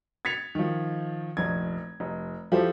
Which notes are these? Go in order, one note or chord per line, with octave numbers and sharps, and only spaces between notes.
G#6 A6 B6 C#7 F7
D#3 F3
F1 A#1 G#6
F1
F3 E4 G4 A4 C5